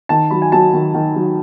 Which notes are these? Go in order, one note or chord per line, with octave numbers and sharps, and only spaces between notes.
D#3 A5
F#3 B5
G#5
F#3 A5
D#3
D#3
F#3